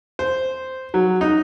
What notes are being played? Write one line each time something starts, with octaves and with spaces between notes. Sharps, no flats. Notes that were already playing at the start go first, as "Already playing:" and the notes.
C5
F#3
D#4